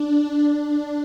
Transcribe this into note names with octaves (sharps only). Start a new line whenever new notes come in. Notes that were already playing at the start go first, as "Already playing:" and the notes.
Already playing: D4
D4